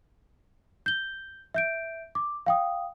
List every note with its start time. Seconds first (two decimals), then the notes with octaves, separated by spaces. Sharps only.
0.86 G6 G7
1.54 E5 G6 D7
2.15 D6
2.46 F5 G5 D#6